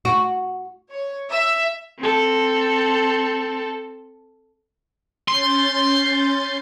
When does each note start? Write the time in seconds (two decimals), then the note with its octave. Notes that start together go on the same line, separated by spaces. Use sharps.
0.05 F#4
0.91 C#5
1.30 E5
1.99 C4 A4
5.28 C#4 C6 G6 A6